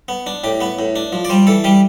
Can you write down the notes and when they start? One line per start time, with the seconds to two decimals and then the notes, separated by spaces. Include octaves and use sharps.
0.08 B3
0.27 D4
0.44 A2 G4
0.61 B3 B4
0.79 A2
0.96 D4
1.13 F3
1.25 D5
1.29 G3 C5
1.47 E3 A4
1.64 G3 G4